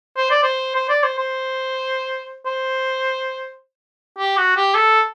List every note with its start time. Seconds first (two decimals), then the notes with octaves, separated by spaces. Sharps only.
0.17 C5
0.31 D5
0.43 C5
0.76 C5
0.89 D5
1.04 C5
1.19 C5
2.46 C5
4.18 G4
4.38 F#4
4.57 G4
4.75 A4